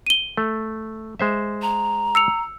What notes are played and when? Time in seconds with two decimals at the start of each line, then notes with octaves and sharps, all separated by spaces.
0.06 D#7 G7
0.37 A3
1.20 G#3 C5 E5
1.62 A#5
2.15 E6 C#7 F7